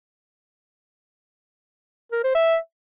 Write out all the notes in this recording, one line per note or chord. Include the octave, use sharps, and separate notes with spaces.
A#4
C5
E5